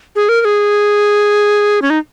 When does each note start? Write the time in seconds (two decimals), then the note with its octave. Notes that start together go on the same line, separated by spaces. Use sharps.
0.16 G#4
0.29 A#4
0.41 A#4
0.45 G#4
1.82 C#4
1.90 D#4